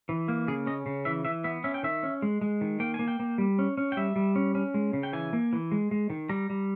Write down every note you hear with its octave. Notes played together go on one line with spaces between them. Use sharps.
E3
A#3
C#3 G#4
C#4 D#5
C#3
E3 E5
E3 E5
B3 E5
C#4 E5
G5
D#3 E5
C#4
G#3
G#3
D#3
A#3 G5
G#5
A#3
G5
A#3
G3
C#4
C#4
G5
G3 E5
G3
C#4
C#4
G#3
C#3
G5
E3 G#5
A#3
E3
G#3
G#3
D#3
G3 A#5
G3